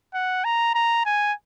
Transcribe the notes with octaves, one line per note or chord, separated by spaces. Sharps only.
F#5
A#5
A#5
G#5